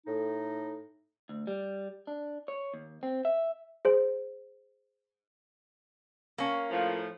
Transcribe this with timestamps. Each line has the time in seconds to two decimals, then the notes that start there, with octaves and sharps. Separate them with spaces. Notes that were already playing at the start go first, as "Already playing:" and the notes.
0.07 A2 D#4
1.29 D2
1.47 G3
2.07 D4
2.48 C#5
2.74 D#2
3.03 C4
3.25 E5
3.85 G#4 C5
6.38 A#3 C#4
6.71 A2 F3